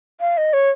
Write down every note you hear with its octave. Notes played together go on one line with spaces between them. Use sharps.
F5
D#5
C#5